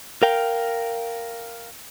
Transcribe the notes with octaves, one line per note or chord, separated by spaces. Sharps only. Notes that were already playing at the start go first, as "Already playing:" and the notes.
A#4 F5 G5